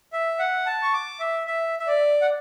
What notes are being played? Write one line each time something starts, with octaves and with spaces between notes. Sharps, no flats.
E5
F#5
A5
C#6
D6
E5
E5
E5
D5
F#5